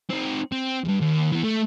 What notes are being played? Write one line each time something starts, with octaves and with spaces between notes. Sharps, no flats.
C4 D#4
C4
E2 G2
D#2
E3 B3
A3